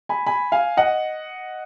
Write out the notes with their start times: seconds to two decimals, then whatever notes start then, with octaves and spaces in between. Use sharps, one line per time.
0.09 G#5 B5
0.26 G#5 B5
0.52 F5 G#5
0.77 D#5 F#5